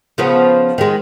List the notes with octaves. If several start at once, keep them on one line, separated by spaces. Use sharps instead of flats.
C#3 F3 B3
D#3 G#3